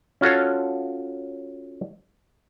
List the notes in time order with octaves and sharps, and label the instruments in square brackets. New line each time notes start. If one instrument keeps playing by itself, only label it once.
[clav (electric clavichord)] C#4 F4 F#4 A4 C#5